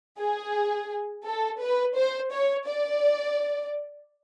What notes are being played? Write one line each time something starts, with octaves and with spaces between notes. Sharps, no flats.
G#4
A4
B4
C5
C#5
D5